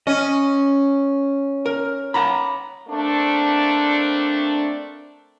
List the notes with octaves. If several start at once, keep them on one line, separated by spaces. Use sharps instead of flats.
C#4 D#5
A#4
F#5 A#5 B5
A3 A#3 C4 D4